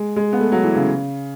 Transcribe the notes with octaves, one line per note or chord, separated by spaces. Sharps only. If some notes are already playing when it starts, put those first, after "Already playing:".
Already playing: G#3
G#3
B3
A3
F#3
E3
C#3